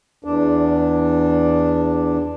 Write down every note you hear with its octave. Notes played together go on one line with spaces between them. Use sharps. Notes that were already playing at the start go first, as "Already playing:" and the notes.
E2 D4